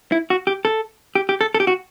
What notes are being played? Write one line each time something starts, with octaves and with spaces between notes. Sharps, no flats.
E4
F#4
G4
A4
G4
G4
A4
A4
G4
F#4